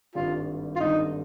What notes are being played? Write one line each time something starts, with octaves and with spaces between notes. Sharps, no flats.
G#1 G2 D3 G3 F4
F4
G#1 G2 D3 G3 D#4